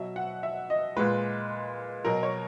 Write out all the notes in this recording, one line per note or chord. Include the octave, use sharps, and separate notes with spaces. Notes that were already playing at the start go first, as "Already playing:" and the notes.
Already playing: B2 F#3 E5
F#5
E5
D#5
A#2 G#3 B4
B2 F#3 A#4
C#5